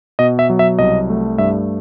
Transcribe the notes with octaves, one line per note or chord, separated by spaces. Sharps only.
B2 D#5
E5
F#3
E5
C2 D#5
A3
G2 E5